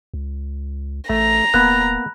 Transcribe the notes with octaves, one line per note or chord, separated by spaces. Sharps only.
C#2
A1 A3 A#5
D1 A#3 B3 B5 F#6